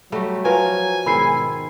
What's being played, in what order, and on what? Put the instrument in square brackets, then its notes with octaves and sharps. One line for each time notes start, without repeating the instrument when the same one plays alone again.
[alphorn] F#3 [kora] G3 A3 F#4
[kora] F3 A#4 [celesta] B4 [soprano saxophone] G#5
[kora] G#2 D#3 [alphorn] B2 [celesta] B5 E6 C7